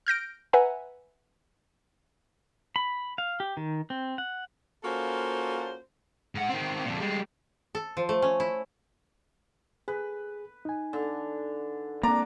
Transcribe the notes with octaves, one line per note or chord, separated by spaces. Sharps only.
F6 G6 A#6 D7
B4 E5 F#5 G#5 A#5
B5
F5
G4
D#3
C4
F#5
A#3 C#4 F4 F#4 A4 C5
G#2 F#5
D#3 C4
F2 A#2
G3 G#3
A4
F3
A3
C#4
E4
G#4 B4
D#4 G#5
D3
A#3 C4 D4 D5 A#5